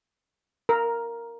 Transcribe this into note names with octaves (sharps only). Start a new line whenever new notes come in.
A#4